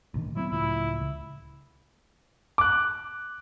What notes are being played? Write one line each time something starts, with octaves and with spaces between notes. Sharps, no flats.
D2 A#2 D#3
F#3 B3 C4 E4
C#2 A2 F3 E4
C#2
D6 F#6